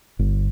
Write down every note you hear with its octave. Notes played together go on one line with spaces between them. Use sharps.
G1